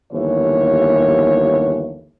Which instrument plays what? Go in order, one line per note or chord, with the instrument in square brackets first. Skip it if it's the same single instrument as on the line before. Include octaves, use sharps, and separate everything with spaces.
[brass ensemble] G1 D#2 E3 C#5